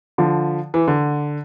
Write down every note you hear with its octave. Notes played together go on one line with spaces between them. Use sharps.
D3 F3
E3
D3